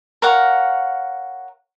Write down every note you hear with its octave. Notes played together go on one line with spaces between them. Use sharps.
A#4 C#5 F5 F#5